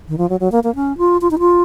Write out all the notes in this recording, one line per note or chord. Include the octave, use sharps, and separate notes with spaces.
D#3
F3
F#3
F#3
A#3
A#3
C#4
F4
F4
D#4
F4